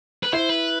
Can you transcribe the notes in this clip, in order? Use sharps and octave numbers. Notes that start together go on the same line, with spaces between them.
B4
E4 C5
B4